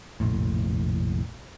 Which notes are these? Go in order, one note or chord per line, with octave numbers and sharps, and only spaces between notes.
F1 A#1 A2